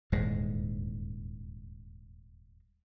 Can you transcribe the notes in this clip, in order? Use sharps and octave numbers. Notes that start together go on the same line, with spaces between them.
D#1 E2 G#2 G#3